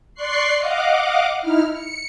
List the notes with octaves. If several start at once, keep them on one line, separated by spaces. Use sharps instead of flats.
D5 C6 C#6 F#6 C7
D#5 F5 F#5 D6
D#4 E4 F6
C#7